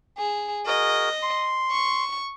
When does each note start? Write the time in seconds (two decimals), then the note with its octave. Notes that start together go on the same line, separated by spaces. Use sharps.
0.18 G#4
0.66 F#4 G#4 A#4 D#5
1.22 C6
1.71 C#6